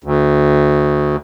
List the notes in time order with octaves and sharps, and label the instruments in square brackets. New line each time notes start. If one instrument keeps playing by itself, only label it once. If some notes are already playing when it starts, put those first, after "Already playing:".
[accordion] D2